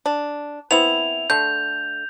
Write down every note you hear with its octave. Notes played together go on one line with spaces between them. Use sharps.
D4
B3 C4 E4 F7
D3 A3 G6